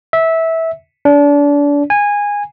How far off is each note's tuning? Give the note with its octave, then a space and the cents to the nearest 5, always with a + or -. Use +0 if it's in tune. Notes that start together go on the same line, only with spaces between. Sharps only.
E5 -15
D4 -30
G#5 -15